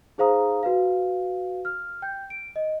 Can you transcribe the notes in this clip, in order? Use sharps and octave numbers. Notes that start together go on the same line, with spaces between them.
D#4 G#4 C5 F5 A#5 D#6
F#4 B4 F5
F6
G5 G6
D7
D#5